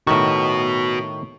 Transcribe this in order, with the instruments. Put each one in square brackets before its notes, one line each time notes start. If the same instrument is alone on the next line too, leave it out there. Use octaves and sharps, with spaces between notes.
[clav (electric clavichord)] A2 D#3 [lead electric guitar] F#4 B4 [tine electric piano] C#6